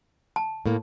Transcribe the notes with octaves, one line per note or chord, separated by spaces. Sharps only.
A5
A2 A#3